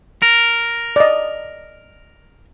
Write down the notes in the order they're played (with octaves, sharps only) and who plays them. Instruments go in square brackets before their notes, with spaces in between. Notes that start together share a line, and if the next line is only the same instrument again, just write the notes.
[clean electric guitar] A#4
[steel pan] D5 D#5